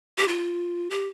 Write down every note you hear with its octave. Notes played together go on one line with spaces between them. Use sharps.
G4
F4
G4